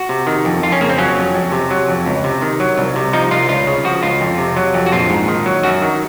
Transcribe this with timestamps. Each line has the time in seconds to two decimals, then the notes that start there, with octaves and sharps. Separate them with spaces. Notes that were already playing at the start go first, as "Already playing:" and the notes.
Already playing: F#4
0.09 C3
0.27 D#3
0.45 F2
0.63 F2 F4
0.72 C#4
0.81 C#3 A#3
0.89 C4
0.98 F#3 C#4
1.17 F2
1.35 F2
1.52 C3
1.71 F#3
1.88 F2
2.06 C#2
2.24 C3
2.42 D#3
2.60 F#3
2.78 C2
2.96 C3
3.13 F3 D#4
3.31 C2 F4
3.49 C#2 F4
3.67 C#3
3.85 F3 F#4
4.03 C#2 F4
4.21 F2
4.38 C3
4.56 F#3
4.74 F2
4.86 F#4
4.92 A#1 F4
5.10 G#2
5.28 D#3
5.46 F#3
5.63 F#2 F#4
5.82 D#3